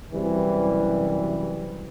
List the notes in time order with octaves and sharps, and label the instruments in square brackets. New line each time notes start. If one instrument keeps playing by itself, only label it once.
[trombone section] F#2 C3 E3 G3